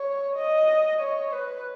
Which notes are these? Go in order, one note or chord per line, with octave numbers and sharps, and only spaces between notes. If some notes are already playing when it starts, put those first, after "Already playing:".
Already playing: C#5
D#5
C#5
B4